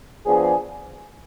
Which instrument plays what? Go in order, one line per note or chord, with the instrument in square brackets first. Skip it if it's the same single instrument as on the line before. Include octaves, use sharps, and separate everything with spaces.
[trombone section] F3 B3 D4 G#4